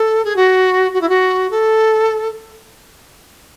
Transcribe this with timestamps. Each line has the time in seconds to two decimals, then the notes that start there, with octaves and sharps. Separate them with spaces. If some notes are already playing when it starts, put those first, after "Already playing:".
Already playing: A4
0.25 G#4
0.36 F#4
0.93 F#4
1.01 E4
1.09 F#4
1.51 A4